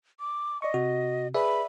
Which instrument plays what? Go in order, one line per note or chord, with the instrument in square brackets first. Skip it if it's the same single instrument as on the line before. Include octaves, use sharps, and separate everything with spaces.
[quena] D6
[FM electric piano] D5 C#6 [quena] D#5
[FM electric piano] C3 [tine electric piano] F#4
[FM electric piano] G#4 B4 [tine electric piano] D5 E5 [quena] B5